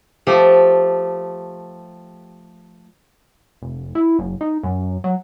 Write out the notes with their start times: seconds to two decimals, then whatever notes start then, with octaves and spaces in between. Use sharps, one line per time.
0.27 F3 A3 G4
3.62 F1
3.95 E4
4.19 F#1
4.41 D#4
4.63 F#2
5.04 F#3